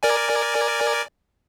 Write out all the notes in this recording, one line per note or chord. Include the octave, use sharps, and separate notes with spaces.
A#4 D5 G#5